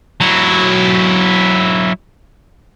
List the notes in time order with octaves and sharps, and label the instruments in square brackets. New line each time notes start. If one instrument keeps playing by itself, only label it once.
[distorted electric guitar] F#3 E4